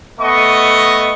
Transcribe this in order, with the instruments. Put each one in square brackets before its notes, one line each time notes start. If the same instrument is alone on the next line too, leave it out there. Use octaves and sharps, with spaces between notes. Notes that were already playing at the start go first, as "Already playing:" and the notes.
[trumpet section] A3 B3 D#5 C#6